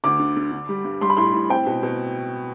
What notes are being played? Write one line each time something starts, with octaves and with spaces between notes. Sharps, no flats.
D2 D6
D3
D3
D3
G3
G2
G3 C6
B5
A2 C6
A2
C4 G5
B2
B2